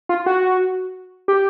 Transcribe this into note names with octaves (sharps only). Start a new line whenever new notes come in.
F4
F#4
G4